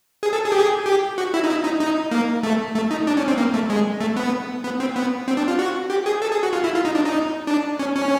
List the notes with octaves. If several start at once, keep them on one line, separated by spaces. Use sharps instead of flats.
G#4
A4
G#4
G4
G#4
G4
F#4
E4
D#4
E4
D#4
D#4
A#3
A3
A3
D#4
D4
C#4
C4
A#3
A3
G#3
A3
B3
B3
C4
B3
C4
D4
F4
F#4
G4
G#4
A4
G#4
F#4
F4
E4
F4
D#4
D4
D#4
D4
C#4
C#4